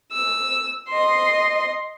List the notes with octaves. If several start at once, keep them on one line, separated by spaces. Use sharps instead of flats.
E6
D#5 C6